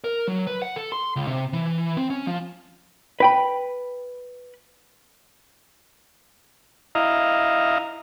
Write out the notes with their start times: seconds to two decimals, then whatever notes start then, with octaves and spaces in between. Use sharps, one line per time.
0.04 A#4
0.28 F#3
0.47 B4
0.62 F#5
0.76 A4
0.92 C6
1.16 C#2
1.27 C3
1.53 E3
1.97 C4
2.10 C#4
2.27 F3
3.20 B4 G5 B5
6.95 E4 D#5 F5 A#5